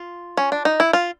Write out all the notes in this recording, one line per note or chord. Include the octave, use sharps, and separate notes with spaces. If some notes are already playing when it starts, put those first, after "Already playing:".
Already playing: F4
C#4
D4
D#4
E4
F4